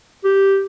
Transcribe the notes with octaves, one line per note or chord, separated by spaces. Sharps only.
G4